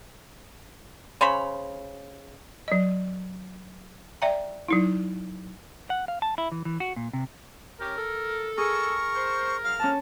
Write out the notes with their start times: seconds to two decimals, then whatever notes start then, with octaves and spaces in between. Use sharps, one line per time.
1.21 C#3 C5 C#5 B5
2.68 F#3 D#5
4.22 D5 E5 G5 A#5
4.68 F#3 D#4 E4
5.90 F#5
6.08 F5
6.22 A5
6.38 E4
6.52 E3
6.65 E3
6.80 F#4
6.96 A#2
7.13 C3
7.80 C#4 G4 A#4
7.98 A4
8.58 G#4 A#4 C#6
9.15 C5
9.64 F#2 F5 F6
9.79 D3 F3 A#3 C#4 A5